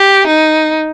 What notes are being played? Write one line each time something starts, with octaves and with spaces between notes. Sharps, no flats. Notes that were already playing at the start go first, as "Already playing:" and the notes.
Already playing: G4
D#4